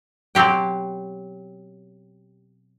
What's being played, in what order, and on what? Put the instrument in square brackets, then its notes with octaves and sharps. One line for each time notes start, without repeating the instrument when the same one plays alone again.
[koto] B2 F#3 C4 G4 G5